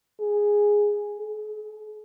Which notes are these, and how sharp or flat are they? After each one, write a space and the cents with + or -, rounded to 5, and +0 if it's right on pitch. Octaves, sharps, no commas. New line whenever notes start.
G#4 -5
G#4 +45